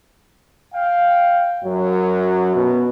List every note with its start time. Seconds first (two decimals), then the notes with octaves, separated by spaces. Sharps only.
0.74 F5 G5
1.64 F#2 F#3
2.55 B2